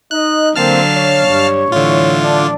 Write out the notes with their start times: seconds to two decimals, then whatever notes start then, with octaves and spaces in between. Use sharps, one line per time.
0.11 D#4 D#5 F#6
0.56 D3 F#3 A#3 C4 F5 A5 F6
0.95 C#5
1.28 G2
1.72 A2 D3 E3 F#3 F4
2.23 D4 D5